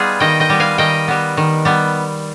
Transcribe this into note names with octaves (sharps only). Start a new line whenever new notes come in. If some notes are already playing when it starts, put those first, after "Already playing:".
Already playing: G3 B3 D#4 F4 G#4
D#3 D#5 G5
D#5 G5
G3 B3
F5 G#5
D#3 D#5 G5
G3 B3
D#3
G3 B3